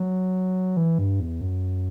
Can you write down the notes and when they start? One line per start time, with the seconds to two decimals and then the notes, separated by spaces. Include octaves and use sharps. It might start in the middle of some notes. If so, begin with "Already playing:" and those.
Already playing: F#3
0.77 E3
0.99 G2
1.20 E2
1.41 F#2